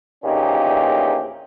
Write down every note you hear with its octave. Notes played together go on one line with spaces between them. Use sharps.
A#1 E2 A#2 C#4 D#4 G4